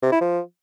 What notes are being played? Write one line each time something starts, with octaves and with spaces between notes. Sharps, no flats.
C3
E4
F3